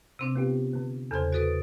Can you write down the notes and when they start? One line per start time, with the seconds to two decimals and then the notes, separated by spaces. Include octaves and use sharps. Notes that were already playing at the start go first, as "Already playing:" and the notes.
0.19 C3 C4 D4
0.35 B3 F4 G4
0.73 D3 B3
1.11 E2 C#3 A4 C5 G#6
1.32 F#4 A4 B4 D#6 A6 D7